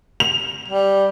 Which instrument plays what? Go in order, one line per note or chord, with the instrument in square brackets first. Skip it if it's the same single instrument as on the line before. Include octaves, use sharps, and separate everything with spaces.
[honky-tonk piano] F7
[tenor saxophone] G3